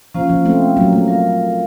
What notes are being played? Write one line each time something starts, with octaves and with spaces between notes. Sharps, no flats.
F3 A#3 C#4 F4 C5 F5
F3
A3 C4
F#3 A#3
A3
F4 A#4 F5